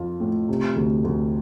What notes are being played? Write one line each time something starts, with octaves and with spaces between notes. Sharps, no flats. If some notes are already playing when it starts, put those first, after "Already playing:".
Already playing: F2 F3 F4
A2
C3
D2
D2